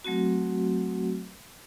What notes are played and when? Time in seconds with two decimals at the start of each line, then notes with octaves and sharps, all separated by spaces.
0.04 F#3 A3 C4 F#4